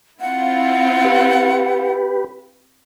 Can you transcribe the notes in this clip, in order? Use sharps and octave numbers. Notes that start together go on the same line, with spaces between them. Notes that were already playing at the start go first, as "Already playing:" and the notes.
C4 E4 F4 F#5
G4 B4